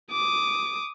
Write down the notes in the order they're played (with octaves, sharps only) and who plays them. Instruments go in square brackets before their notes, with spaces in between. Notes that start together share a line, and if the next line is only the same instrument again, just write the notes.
[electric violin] D6 D#6